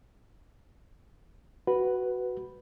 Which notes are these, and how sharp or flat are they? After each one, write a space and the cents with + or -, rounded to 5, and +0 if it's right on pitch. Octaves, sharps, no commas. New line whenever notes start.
F#4 +10 B4 +0